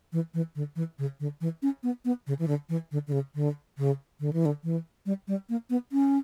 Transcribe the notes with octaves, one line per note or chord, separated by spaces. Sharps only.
E3
E3
D3
E3
C#3
D3
E3
C#4
B3
B3
C#3
E3
D3
E3
D3
D3
C#3
D3
C#3
D3
E3
D3
E3
G3
G3
A#3
B3
C#4